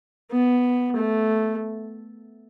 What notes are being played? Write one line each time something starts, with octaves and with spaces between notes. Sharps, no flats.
B3
A3